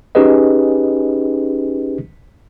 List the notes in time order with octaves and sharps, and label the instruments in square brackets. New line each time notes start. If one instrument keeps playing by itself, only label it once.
[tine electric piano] C#4 D#4 G4 G#4 B4 D#5